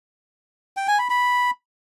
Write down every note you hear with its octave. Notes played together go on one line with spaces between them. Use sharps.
G5
G#5
B5
B5